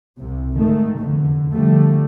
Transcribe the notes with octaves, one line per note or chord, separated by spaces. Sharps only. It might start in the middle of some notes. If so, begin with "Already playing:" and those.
C2 C3
G#2 D#3 A3
F1 E2 D3
D3 F3 G3 A3